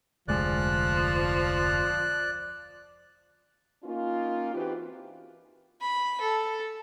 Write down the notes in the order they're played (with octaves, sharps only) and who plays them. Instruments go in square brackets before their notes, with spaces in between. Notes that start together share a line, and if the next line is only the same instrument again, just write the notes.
[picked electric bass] F1 D2 G#3 [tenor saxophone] F3 [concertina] D5 F#6
[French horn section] A#3 C#4 D#4 F4
E3 C4 D#4 F#4 G4 B4
[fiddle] B5
A4